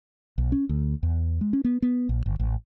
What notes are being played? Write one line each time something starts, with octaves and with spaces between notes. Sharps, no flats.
B1
C#4
D2
E2
G#3
C#4
B3
B3
A#1
G1
A1